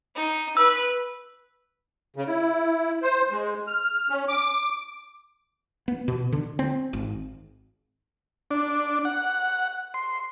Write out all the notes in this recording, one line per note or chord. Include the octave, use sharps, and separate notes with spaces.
D#4
B4 E6
C#3
E4
C5
G#3
F6
C#4
D6
B3
B2
D3
C4
G#1
D4
F#5
C6